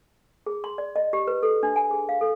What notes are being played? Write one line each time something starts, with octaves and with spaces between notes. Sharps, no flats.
G#4
C6
D5
D#5
G4
B4
A4
D4
G#5
G#4
F5
A4